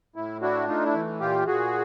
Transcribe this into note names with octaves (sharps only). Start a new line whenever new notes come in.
A2 E4
D4 E4 F#4
A3 D#4 F4
E4
E3
A#2 F4 G4
A#2 F#4 G#4